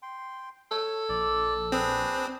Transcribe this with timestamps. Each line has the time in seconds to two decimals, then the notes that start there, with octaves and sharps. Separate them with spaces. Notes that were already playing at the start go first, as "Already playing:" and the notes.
0.02 G5 C6
0.71 A4 C#5
1.09 A#1 D5
1.72 C4 D4 G#4 B4